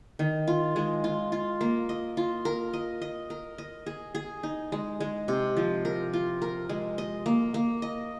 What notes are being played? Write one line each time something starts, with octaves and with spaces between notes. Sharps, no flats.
D#3
F4
G#3
F4
F4
A#3
D#5
F4
A#4
D#5
D#5
A#4
D#5
G#4
G#4
D#4
G#3
G#3
C3
F3
A#4
F4
A#4
G#3
D#5
A#3
A#3
D#5